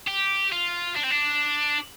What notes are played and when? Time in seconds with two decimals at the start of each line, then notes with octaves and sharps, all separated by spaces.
0.07 G4
0.53 F4
0.97 D4
1.04 C4
1.11 D4